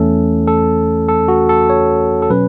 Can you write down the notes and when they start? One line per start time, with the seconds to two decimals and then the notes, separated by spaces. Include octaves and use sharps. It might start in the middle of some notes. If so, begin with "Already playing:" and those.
Already playing: E2 E3 A3 C#4 A4
0.48 A4
1.08 A4
1.28 F#4
1.49 A4
1.70 C#5
2.22 A4
2.30 B2 F#3 C#4 B4